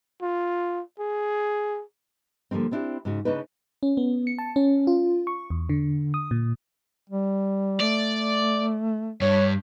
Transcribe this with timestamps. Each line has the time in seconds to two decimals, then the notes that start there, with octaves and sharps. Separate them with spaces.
0.21 F4
1.00 G#4
2.51 D3 F3 G3 A#3 C4
2.71 B3 C4 D4 E4 G4
3.05 G#2 C#3 F#4
3.25 C#3 D4 D#4 B4
3.83 C#4
3.97 B3
4.27 C#7
4.38 A5
4.56 C#4
4.87 F4
5.27 C#6
5.50 E2
5.69 D3
6.14 D#6
6.31 A#2
7.10 G3
7.81 A3 D5
9.21 G2 C#5